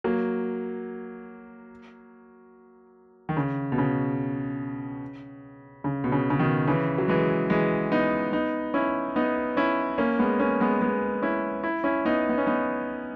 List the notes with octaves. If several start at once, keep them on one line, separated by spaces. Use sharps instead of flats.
F#3 A#3
D#3
C#3
B2
C#3
C#3
B2
C#3
C#3
B2 D#3
C#3 E3
F#3
E3 G#3
E3 G#3
B3 D#4
B3 D#4
C#4 E4
B3 D#4
C#4 E4
A#3 C#4
G#3 B3
A#3 C#4
G#3 B3
G#3 B3
C#4 E4
E4
C#4 E4
B3 D#4
B3
C#4
B3 D#4